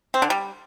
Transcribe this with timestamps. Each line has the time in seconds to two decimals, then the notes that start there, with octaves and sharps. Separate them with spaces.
0.14 C4
0.22 D3
0.30 G3